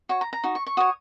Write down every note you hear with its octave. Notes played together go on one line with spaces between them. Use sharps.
F#4 C#5 C#6
A#5
A#5
D#4 F#4
C#6
C#6
F#4 C#5 D#6